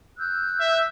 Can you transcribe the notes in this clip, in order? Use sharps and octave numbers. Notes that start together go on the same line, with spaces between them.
E6 F#6 G6
E5